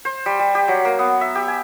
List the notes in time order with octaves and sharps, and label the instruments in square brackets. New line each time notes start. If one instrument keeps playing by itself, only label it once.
[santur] C5
G3
G3
G4
F#3
A#3
B3
E5
G4
G#5